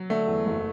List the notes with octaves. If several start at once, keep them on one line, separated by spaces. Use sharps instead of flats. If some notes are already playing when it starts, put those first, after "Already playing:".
Already playing: F#3
D3 A3
E2
F#1